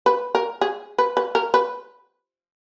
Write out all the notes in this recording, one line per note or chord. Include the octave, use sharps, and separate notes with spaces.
B4
A#4
G#4
B4
B4
A#4
B4